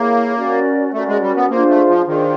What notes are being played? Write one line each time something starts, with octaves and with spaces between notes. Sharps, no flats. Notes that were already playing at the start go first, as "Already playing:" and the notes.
Already playing: A#3 E4 G#4 C#5
C#4 F#4 A#4 D5
A3 C#4 F#4 A#4 D5
G#3
G3
B3
A#3 D4 F4 G#4 C5
A3
F3
D#3 D4 F4 G#4 C5